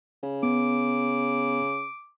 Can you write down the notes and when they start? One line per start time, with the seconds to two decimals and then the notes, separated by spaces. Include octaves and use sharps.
0.23 C#3
0.43 B3 D6